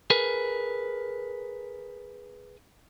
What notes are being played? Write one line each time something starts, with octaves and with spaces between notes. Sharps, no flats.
G#4 A#4 B4